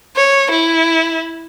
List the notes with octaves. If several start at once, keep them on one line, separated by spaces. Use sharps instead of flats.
C#5
E4